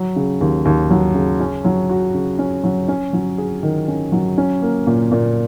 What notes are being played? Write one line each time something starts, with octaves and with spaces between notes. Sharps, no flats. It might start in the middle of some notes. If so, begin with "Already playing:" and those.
Already playing: F#3
C#3
D#2
D#2
F#3
C#3
C#4
F#3
F#4
C#3
C#4
F#3
C#4
F#3
G#4
D#3
C#4
F#3
C#4
A#3
A#2
A#2